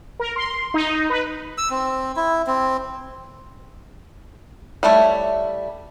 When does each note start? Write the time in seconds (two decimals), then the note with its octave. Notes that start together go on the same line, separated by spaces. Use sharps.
0.19 A#4
0.36 C6
0.74 D#4
1.10 B4
1.58 E6
1.71 C4
2.16 E4
2.47 C4
4.83 G3 A3 E4 C#5